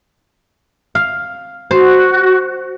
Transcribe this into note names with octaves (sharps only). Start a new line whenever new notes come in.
F5
F#4 C5